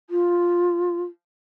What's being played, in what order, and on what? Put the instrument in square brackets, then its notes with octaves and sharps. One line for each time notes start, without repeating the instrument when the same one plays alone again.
[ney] F4